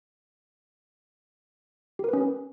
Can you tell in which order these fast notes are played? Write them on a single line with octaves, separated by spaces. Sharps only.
G4 A#4 B4 C#4